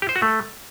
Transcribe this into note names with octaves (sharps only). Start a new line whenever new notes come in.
G4
C5
F#4
A3